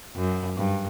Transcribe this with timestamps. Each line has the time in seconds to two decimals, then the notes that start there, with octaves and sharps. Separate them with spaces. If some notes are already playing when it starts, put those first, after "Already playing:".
0.16 F#2
0.58 G2